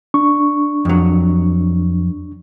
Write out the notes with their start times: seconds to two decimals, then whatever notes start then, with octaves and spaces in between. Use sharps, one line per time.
0.14 D4 C#6
0.85 F2 F#3